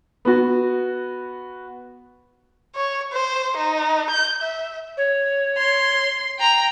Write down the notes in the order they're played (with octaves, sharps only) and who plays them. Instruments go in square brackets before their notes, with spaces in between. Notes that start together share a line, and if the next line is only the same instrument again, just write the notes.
[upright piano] B3 F#4
[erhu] C#5
C5
D#4
G6
E5
[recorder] C#5
[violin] C6
G5 A#5